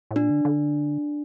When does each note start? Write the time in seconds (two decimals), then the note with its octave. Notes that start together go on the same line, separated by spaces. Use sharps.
0.11 A2
0.16 A#2 D4
0.30 D3
0.45 D3